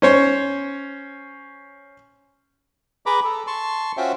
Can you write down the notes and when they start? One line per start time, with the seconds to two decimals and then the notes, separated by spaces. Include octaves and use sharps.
0.02 C#4 C5 C#5
3.06 G#4 B4 A#5 B5 D6
3.24 A4
3.47 A5 C6 C#6
3.97 C#4 F4 F#4 C5 E5 G5